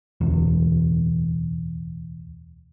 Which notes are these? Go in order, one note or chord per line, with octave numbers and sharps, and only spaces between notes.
D1 B1 E2